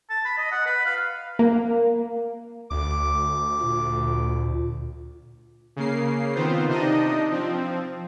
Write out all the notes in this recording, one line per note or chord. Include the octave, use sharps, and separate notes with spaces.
A5
B5
D#5
F#5
B4
F5
A#3
D2 D6
A#2
C#3 A#3 C7
D#3 B3 C4 F4 C5
C3 D4 D#4 D#5
F3 C4